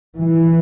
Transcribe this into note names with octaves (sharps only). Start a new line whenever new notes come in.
E3